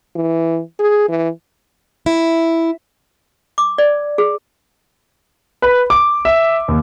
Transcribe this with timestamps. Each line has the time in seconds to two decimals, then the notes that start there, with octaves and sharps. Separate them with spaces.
0.16 E3
0.79 G#4
1.09 E3
2.06 E4
3.58 D6
3.78 D5
4.18 G#4
5.62 B4
5.90 D6
6.25 E5
6.68 D#2